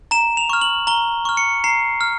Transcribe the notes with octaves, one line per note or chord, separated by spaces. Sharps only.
A#5 E7
F7
C#6 F6
F#7
A#5 G7
C#6 F6
C#7
A#5 C7
F6